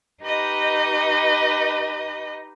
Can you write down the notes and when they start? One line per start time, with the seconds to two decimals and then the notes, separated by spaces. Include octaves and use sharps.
0.21 D#4 G4 B4 D#5